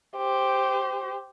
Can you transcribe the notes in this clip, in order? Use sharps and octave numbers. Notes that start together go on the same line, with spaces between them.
G4 C5